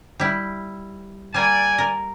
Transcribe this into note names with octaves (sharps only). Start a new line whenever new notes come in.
G3 E4
G3 A#3 D5 G#5
A#4